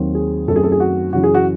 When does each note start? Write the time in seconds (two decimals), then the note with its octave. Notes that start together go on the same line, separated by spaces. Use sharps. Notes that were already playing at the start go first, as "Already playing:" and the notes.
Already playing: D#2 D#3 F#3 C4
0.15 G#4
0.48 F#2 D#3 A3 C4 A4
0.56 G#4
0.63 A4
0.72 G#4
0.80 F#4
1.13 F#2 C#3 E3 F#4
1.24 G#4
1.35 F#4